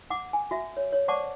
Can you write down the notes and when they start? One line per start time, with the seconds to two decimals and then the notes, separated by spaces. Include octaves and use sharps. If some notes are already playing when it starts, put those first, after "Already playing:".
0.10 F#5 D6
0.33 G#5
0.51 F#4 E5
0.77 C#5
0.93 C#5
1.08 C5 D5 F#5 A5 C#6 D6